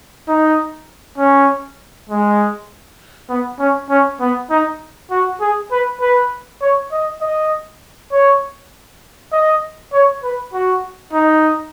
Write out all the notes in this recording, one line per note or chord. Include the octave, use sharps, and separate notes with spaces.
D#4
C#4
G#3
B3
C#4
C#4
B3
D#4
F#4
G#4
B4
B4
C#5
D#5
D#5
C#5
D#5
C#5
B4
F#4
D#4